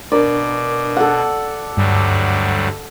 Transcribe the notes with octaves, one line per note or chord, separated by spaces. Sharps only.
B2 D4 A#4 D5
A4 F#5
D2 G2 F#3 G3